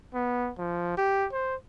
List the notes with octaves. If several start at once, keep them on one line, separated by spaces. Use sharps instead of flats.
B3
F3
G4
C5